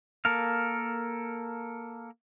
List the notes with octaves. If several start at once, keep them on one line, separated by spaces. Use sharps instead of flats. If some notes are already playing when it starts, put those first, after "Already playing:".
A#3 A4 A#4 F5